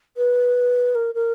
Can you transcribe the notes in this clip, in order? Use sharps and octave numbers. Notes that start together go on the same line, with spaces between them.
B4
A#4
A#4